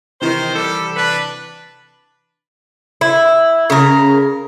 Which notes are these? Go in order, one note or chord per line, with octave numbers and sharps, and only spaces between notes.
C3 D#3 E3 C5
G3 A4
D4 B4
E4
C#3 A#4